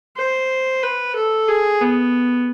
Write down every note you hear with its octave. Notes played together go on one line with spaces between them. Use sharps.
C5
B4
A4
G#4
B3